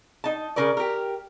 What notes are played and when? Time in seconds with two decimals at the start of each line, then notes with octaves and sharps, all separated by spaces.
0.24 D#4 A5
0.56 C#3 A#4 B4 D5
0.77 G4 A#4